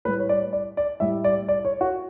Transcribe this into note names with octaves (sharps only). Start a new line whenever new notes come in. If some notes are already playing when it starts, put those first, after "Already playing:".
A2 G3 B4
C#5
D5
D5
D5
A2 G3 E5
D5
D5
C#5
F#4